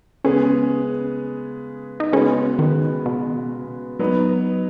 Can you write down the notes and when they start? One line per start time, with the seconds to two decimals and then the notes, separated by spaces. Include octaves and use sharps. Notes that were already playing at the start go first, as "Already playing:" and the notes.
0.24 C#3 G#3 B3 C#4 G#4
2.00 D#4
2.12 C#3 G#3 B3 C#4 F#4 B4
2.59 D#3
3.06 B2
3.99 F#3 B3 D#4 B4